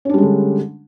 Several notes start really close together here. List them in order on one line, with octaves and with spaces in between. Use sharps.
C#4 D4 G3 G#3 D3